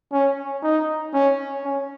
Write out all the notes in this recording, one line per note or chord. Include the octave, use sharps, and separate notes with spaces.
C#4
D#4
C#4
C#4